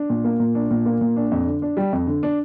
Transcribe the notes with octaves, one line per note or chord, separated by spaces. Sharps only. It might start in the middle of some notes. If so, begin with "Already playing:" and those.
Already playing: D4
A#2
A#3
A#2
D4
A#2
A#3
A#2
D4
F2
D3
D4
G3
F2
D3
D4